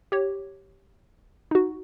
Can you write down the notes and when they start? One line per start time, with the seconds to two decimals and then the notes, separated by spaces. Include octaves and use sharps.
0.12 G4 C#5
1.51 D#4 F#4